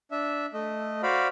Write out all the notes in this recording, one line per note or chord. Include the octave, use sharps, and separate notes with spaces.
D4 E5
A3 D#5
F#4 C5 D5 F5 B5